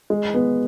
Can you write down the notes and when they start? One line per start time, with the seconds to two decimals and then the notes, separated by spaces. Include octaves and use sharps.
0.10 G#3
0.34 B3